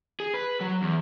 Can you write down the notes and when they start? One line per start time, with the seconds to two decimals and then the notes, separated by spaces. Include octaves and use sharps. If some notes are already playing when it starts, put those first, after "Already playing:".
0.20 G#4
0.34 B4
0.61 F#3
0.82 E2